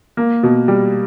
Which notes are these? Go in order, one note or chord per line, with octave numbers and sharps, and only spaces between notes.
A#3
B2
G3